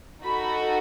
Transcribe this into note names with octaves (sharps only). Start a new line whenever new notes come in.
D#4 F#4 A4 B5